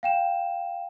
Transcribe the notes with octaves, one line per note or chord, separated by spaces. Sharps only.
F5 G5 E7